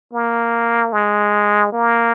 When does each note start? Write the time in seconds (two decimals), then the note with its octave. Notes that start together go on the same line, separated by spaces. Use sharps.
0.13 A#3
0.92 G#3
1.73 A#3